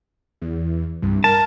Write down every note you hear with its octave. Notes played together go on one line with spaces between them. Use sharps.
E2
C2 G2
A#4 A5